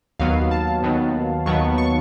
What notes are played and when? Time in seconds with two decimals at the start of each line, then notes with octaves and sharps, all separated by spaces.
0.20 D#2 D#3 F#3 B3 F5
0.51 A5
0.83 D#2 D#3 F#3 B3
1.46 D#2 D#3 F#3 B3 C#6
1.78 C#6